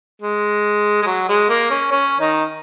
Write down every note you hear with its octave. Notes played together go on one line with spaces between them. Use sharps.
G#3
G#3
F#3
G#3
A#3
C#4
C#4
D#3 D#4